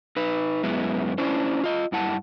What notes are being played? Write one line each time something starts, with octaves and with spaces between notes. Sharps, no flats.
D#4 B4
F#2 G#3 B3 E4
C#4 D4 E4 C5
F4 D#5
G2 E4 F#5 A5